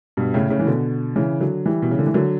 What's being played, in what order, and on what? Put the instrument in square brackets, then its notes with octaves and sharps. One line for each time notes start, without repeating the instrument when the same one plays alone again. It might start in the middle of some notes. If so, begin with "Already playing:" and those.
[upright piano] G2 B2
A2 C#3
A2 C#3
E3
B2 D3
C#3 E3
D3 F#3
E3 G3
B2
C#3
D3
E3
D3 F#3